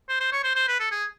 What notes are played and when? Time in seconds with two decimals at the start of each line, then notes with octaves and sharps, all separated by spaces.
0.09 C5
0.20 C5
0.32 C#5
0.44 C5
0.55 C5
0.68 B4
0.80 A4
0.91 G#4